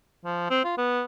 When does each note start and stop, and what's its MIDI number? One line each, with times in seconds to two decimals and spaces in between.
0.24 0.50 53
0.50 0.60 60
0.64 0.76 65
0.77 1.02 59